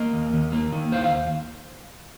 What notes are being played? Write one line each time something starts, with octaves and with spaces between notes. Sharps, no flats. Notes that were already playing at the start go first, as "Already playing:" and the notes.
Already playing: A#3 A#4 D#5
D#2
D#2
A#3
D#3
D#2 C5 F5
F5